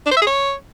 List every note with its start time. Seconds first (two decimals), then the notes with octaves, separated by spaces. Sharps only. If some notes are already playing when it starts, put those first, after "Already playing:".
0.06 D4
0.11 C5
0.17 E5
0.22 G#4
0.27 C#5